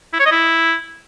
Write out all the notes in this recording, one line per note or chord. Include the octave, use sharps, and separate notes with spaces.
E4
C#5
D#5
E4